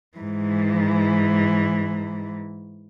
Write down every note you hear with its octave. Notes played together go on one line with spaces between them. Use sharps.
G#2 E3